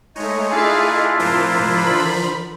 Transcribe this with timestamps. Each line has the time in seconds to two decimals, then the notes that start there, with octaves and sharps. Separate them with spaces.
0.16 G#3 A3 D#4 C#5
0.51 D4 E4 F4 G#4 E5 F5
1.19 A2 C3 F3 A#4 C5
1.78 D3 E3 B5